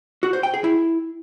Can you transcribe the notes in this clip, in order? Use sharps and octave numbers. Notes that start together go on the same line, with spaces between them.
F#4
C5
G5
G#4
E4